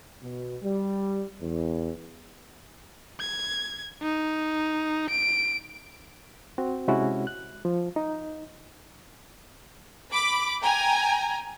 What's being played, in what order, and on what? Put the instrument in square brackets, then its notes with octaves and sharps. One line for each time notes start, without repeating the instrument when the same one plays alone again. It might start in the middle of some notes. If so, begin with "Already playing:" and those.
[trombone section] B2
G3
E2
[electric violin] G#6
D#4
D7
[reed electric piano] C4 F#4
C3 G#3 C#4 E4 F#4
F#6
F3
D#4
[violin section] B5 D6
G5 G#5 A#5